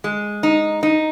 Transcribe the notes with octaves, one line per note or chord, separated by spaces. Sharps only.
G#3
D#4
D#4